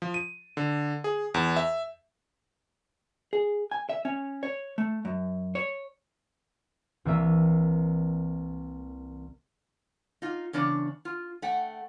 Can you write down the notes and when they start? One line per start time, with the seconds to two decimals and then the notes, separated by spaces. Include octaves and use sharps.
0.02 F3
0.14 D#7
0.57 D3
1.04 G#4
1.34 E2
1.56 E5
3.33 G#4
3.71 G#5
3.89 E5
4.05 C#4
4.43 C#5
4.78 A3
5.05 F#2
5.55 C#5
7.05 C2 E3 G3 A#3 E5 D#7
10.22 D#4 F4
10.53 E2 C#3 D4 C#5
11.05 F4
11.42 A3 F#5 G5